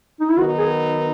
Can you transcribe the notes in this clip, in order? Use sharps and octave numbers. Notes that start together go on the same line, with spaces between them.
D#4
E4
D#3 F#3 B3 D#4 F#4
G#4